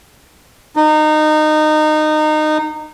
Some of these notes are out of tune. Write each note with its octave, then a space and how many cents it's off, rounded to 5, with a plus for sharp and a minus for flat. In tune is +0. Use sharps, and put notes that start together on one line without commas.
D#4 -20